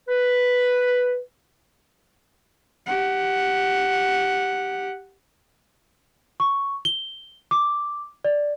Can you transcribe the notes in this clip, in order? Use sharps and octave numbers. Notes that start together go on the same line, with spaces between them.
B4
G4 F#5
C#6
G7
D6
D5